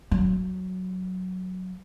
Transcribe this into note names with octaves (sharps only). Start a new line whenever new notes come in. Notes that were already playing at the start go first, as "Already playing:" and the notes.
F#3